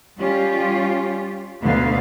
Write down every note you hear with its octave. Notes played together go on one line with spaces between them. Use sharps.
G3 C#4 F4 G4
D2 B2 D3 B3 F5